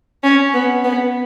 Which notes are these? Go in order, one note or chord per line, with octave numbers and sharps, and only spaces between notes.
C#4
B3
B3